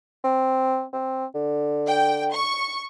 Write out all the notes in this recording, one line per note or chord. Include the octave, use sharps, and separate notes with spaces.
C4
C4
D3
G5
C#6